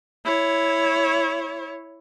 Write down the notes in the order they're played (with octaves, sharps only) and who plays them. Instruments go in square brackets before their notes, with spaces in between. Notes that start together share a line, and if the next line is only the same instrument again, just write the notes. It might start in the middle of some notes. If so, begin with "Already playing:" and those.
[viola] E4 C#5